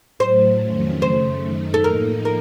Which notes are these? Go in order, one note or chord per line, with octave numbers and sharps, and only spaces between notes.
A2 F#3 A3 C5
F2 D#3 F#3 A3 C#4
F#2 C#3 A3 C5
F#2 D#3 A3 D#4
A4
A2 F3 A#3 D#4 A#4
A#4